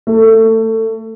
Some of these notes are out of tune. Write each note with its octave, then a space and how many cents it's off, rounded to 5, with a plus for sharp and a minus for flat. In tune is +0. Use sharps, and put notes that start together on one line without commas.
A3 +25